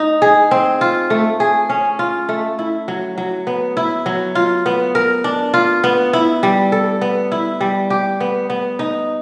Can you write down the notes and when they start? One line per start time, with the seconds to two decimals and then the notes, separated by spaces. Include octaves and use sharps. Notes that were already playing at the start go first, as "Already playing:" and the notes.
Already playing: D#4
0.22 G#4
0.51 C4
0.81 F4
1.10 A3
1.40 G#4
1.69 C#4
1.99 F4
2.29 A3
2.59 E4
2.88 F#3
3.18 F#3
3.47 B3
3.77 E4
4.06 F#3
4.35 F4
4.66 B3
4.95 A#4
5.24 D4
5.54 F4
5.84 B3
6.13 E4
6.43 G3
6.72 A4
7.01 B3
7.32 E4
7.61 G3
7.90 G4
8.20 B3
8.50 B3
8.79 D#4